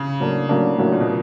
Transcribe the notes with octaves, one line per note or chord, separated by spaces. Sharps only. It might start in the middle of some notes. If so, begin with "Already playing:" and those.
Already playing: C#3
A2 F#3 A#3 D4
A2 C#3 F#3 A#3 D4
A2 F#3 A#3 D4
A#2
B2